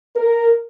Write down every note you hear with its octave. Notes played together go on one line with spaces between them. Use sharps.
A#4